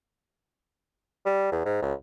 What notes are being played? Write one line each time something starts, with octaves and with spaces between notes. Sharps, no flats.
G3
E2
G#2
C#2